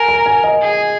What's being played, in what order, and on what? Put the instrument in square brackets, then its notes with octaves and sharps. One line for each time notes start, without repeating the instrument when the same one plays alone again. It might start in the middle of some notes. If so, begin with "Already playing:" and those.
Already playing: [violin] A#4 [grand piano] G#5
[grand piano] A#5
G#5
D#5
[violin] G#4